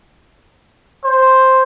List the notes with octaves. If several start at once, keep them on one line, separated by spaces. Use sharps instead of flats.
C5